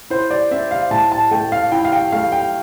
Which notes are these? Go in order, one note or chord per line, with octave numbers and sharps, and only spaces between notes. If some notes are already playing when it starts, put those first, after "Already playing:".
E4 C5
D5
C4 E5
F5
A2 A5
A5
A3 G5
F5
E4 G5
F5
G5
A3 F5
G5